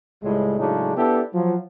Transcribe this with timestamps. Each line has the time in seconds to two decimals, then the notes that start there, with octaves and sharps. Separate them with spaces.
0.23 C#2 A2 C#3 G3 G#3
0.59 A2 C#3 F#3 G#3 D4 D#4
0.97 B3 D4 E4 G4 A4
1.34 F3 F#3